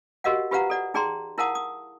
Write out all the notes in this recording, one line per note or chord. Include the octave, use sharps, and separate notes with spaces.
F#4 G4 A#4 D#5 F5 F#5
F4 G4 B4 F5 F#5 A#5
A4 D5 F#5
D#4 G#4 D5 G5 A#5 C6
E4 A#4 F5 F#5 A5 D#6
D#6